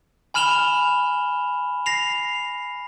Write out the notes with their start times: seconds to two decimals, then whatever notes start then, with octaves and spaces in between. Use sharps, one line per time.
0.34 G#5 B5 F6 E7 F7 G7
1.86 A#6 C7 F7